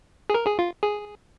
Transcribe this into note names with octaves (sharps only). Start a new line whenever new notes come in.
G#4
A#4
G#4
F4
G#4